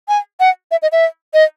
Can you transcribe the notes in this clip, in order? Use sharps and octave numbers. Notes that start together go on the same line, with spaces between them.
G#5
F#5
E5
D#5
E5
D#5